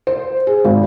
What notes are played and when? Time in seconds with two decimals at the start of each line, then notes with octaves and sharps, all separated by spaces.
0.07 C5
0.47 G#4
0.64 G#1